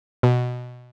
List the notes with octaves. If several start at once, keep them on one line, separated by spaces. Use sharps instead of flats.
B2